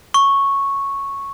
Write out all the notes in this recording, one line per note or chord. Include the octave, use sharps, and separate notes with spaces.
C#6